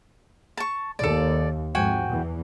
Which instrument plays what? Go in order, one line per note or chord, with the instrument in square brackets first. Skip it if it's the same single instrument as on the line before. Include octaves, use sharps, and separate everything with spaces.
[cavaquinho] A5 C#6
[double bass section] D#2 [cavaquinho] A4 D5
[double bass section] F2 G#2 [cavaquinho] F#4 G5 G#5
[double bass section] E2 E3